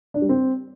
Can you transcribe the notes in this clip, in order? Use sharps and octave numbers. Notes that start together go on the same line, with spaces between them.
D4
G3
C4